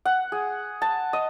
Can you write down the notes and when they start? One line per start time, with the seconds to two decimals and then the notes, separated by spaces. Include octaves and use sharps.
0.05 F#5
0.32 G#4
0.82 A5
1.13 D#5